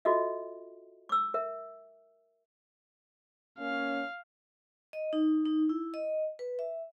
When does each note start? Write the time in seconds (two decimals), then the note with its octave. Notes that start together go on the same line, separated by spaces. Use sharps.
0.05 F4 F#4 A4 D#5 E5
1.09 D6 E6
1.34 A#4 E5
3.59 A#3 C#4 F5
4.93 D#5
5.13 D#4
5.45 D#4
5.69 E4
5.94 D#5
6.39 B4
6.59 E5